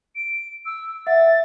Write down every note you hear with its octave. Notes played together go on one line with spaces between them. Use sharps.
D7
E6
E5 F#5 A6